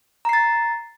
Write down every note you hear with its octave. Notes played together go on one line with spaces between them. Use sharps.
A#5 A6 C7